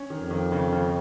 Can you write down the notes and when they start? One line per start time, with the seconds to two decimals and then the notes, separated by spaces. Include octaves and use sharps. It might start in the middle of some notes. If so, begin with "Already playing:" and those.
Already playing: C#4
0.10 D#3
0.20 F2
0.31 D#3
0.52 C#3
0.73 C#3